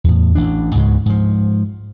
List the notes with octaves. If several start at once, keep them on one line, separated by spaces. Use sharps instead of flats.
E2 A2
A1 E3 D4
C#2 G#2 C#3 G#3
G#2 F3